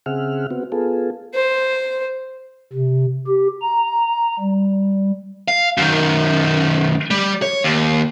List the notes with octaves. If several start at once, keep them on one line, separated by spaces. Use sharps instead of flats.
C#3 C4 G#4 E5 F#5 F6
B3 C4 F#4
B3 F4 G#4 A4
C5
C3
G4
A#5
G3
F5
F#2 D#3
G3
C#5
D#2